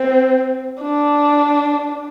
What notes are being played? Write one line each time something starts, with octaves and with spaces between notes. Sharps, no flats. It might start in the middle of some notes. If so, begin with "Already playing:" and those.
Already playing: C4
D4